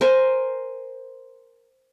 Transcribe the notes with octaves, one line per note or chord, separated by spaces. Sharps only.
A#4 C5 G#5